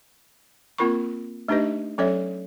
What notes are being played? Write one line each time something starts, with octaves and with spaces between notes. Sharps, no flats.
A#3 C4 F4 A#4 B5 C#6
A3 D4 D#4 G4 B4 D#5
F#3 C#4 A4 C#5 D5 E5